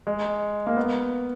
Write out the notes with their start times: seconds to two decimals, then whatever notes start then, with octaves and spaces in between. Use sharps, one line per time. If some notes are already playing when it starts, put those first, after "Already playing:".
0.07 G#3
0.67 A#3
0.77 B3